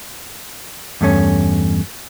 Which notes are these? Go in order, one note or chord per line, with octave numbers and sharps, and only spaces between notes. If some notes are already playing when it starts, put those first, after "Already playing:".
E2 G2 A3 C#4